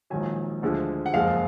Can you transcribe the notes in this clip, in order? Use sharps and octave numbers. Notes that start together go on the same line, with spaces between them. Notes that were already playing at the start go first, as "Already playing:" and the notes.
A#1 G#2 D#3 F#3 G#5
D2 D3 F3 G#3
F#5
F#1 F2 F3 G#3 F5